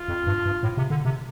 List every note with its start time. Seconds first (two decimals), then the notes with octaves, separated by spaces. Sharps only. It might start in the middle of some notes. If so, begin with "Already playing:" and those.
Already playing: F4
0.08 F2
0.27 G2
0.46 G2
0.63 A2
0.77 C3
0.90 D3
1.05 C3